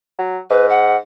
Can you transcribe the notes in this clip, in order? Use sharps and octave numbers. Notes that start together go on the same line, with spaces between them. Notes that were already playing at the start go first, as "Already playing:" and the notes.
F#3
G#2 B4
F#5